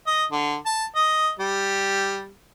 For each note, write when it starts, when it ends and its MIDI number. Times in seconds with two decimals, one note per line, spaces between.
0.07 0.24 75
0.32 0.56 50
0.66 0.85 81
0.96 1.31 75
1.39 2.30 55